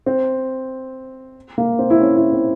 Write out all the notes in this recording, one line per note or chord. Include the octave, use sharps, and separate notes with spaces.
C4
A#3
C4
E4
C#4
E4
C4